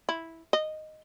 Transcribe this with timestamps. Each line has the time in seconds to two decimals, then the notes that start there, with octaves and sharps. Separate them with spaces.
0.09 E4
0.53 D#5